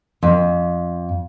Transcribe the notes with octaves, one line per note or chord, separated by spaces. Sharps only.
F2